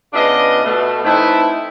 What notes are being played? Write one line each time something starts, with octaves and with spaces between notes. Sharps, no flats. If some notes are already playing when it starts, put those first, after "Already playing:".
C#3 B3 D4 F4 D#5
B2 A3
E3 A3 C4 D#4 E4